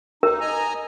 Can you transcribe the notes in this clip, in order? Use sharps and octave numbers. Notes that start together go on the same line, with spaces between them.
D#4 A#4
D#5 G#5 A#5